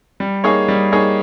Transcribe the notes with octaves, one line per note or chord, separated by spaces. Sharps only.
G3
A#3 D#4 G#4 C#5
G3
A#3 D#4 G#4 C#5